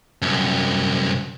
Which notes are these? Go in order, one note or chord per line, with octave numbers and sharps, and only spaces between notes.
C2 F#2